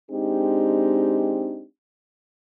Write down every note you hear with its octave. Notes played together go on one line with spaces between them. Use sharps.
G#3 C4 D4 D#4 G4